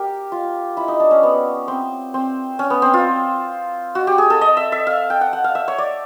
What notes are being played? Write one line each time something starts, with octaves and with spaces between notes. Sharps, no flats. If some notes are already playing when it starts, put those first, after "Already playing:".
Already playing: G4 A#4
F4
E4
D#4
D4
C#4
B3
C4
C4
C#4
B3
C4
F4
F#4
G4
G#4
A4
D#5
E5
E5
F5
G5
F#5
F#5
F5
E5
C#5
D5